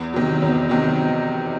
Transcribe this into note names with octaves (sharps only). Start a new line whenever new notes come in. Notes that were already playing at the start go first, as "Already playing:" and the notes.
Already playing: E2
C3 D#3 F#3
E2
C3 D#3 F#3